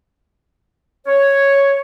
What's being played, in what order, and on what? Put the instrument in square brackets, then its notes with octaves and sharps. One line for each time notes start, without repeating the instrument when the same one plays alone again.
[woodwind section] C#5